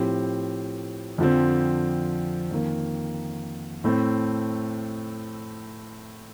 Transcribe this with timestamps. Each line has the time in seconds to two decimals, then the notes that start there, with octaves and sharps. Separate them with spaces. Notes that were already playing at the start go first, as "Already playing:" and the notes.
Already playing: A2 F3 C4 G4
1.18 F2 D3 F3 C4
2.51 F2 D#3 A#3
3.84 A2 A3 C4